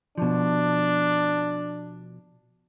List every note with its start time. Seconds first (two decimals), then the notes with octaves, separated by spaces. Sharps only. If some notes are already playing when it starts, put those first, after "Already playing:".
0.18 B2 F3 D4